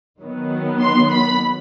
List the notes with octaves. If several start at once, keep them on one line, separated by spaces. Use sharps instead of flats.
D#3 F#3 B3
C6
B5